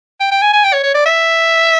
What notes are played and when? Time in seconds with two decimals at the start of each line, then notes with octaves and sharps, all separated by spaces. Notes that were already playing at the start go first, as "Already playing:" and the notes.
0.21 G5
0.31 G5
0.42 G#5
0.53 G#5
0.64 G5
0.73 C#5
0.84 C#5
0.94 D5
1.06 E5